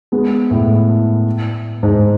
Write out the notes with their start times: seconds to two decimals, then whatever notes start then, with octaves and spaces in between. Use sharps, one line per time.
0.12 G#3 B3
0.51 A2
1.83 G#2